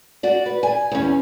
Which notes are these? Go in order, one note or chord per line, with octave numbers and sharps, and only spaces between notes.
F#4 D5
B4
G#5
E2 C#4